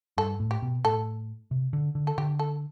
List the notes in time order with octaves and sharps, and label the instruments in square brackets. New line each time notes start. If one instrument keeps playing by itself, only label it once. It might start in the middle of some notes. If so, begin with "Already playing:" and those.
[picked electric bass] G2 [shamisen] A4
[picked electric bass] A2
[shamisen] G4
[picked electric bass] B2
[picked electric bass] A2 [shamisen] A4
[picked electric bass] C3
D3
D3
[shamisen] A4
[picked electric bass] D3 [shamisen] G4
[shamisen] A4